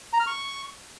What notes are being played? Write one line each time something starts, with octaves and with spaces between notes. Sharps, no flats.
A#5
F6
C#6